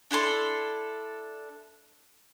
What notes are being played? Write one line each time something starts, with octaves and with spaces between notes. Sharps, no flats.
D4 E4 A4 C6